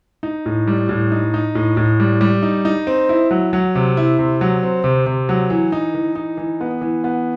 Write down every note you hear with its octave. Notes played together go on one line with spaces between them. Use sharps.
D#4
A2
G3
A2
D#4
D#4
A2
A2
G3
G3
D#4
D#4
C4
E4
F#3
F#3
C3
E4
C3
F#3
C4
C3
C3
F#3
E3
D#4
E3
D#4
E3
B3
E3
B3